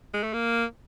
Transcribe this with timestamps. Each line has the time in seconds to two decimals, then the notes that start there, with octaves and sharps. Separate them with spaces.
0.14 G#3
0.24 A3
0.34 A#3